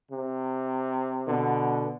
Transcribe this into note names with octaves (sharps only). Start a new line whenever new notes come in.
C3
B2 D3